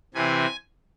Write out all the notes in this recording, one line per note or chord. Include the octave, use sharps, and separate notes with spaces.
C3 E3 C4 G#5